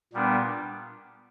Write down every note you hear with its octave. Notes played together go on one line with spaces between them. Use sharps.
A#2 G3 B3 D4